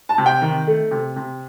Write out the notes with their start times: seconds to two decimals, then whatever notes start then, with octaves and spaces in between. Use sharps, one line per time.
0.09 A5
0.18 C3
0.26 G5
0.42 D#3
0.67 A3
0.91 C3
1.16 C3